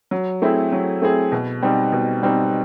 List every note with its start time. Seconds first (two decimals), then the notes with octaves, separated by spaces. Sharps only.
0.11 F#3
0.42 A3 C4 E4 G#4
0.72 F#3
1.02 A3 C4 E4 G#4
1.32 B2
1.62 G3 C4 D#4
1.92 B2
2.23 G3 C4 D#4